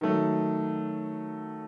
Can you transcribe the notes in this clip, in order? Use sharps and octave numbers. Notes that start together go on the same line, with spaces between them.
D#3 F#3 A3